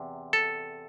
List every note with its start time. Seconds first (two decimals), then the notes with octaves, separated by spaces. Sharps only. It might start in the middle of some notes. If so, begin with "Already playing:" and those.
Already playing: E2 C3
0.33 A4